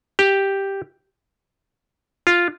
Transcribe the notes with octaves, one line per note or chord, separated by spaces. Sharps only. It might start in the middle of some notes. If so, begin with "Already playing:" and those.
G4
F4